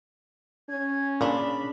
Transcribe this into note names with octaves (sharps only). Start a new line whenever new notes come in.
C#4 G#6
A#2 C#3 D4 B5